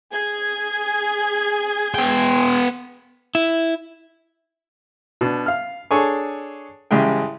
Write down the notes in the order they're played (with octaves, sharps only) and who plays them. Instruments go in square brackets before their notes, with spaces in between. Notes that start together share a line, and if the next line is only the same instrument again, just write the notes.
[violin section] G#4 G#6
[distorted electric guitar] B3 G5
[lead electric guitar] E4
[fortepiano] B2 D4
F5 F6
D4 G#4 A4 C#5 G#5 C#6
A1 C#3 G3 G#3 G#4 G5